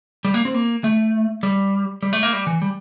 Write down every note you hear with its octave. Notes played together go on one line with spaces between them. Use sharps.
G3
A#3
C4
A#3
A3
G3
G3
A3
A#3
G3
E3
G3